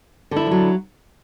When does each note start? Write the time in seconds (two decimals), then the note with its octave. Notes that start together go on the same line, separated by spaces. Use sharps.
0.31 D3
0.36 E4
0.41 D4
0.46 F3
0.51 F#3